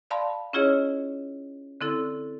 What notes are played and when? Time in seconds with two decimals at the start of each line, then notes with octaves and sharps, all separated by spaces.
0.11 D5 F5 A5 B5 C6
0.53 C#4 E4 F4 G#4 C#5 D#5
1.81 D3 C4 E4 A4